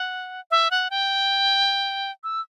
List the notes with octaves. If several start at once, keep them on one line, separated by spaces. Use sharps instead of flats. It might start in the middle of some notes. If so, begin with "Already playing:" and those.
Already playing: F#5
E5
F#5
G5
E6